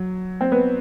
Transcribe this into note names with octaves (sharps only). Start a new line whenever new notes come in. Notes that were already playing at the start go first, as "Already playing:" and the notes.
Already playing: F#3
C4
B3